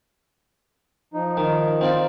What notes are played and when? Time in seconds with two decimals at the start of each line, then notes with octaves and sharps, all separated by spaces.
1.14 F3 D#4
1.37 D#3
1.81 C4 F4 D5